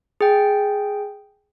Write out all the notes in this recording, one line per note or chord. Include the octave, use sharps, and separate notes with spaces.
G#4 G5